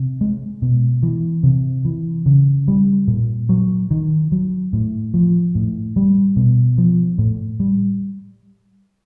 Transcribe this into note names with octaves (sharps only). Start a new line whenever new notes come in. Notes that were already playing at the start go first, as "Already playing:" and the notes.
Already playing: C3
G#3
B2
E3
C3
E3
C#3
G3
A#2
F#3
D#3
F#3
A2
F3
A2
G3
B2
F3
A2
G3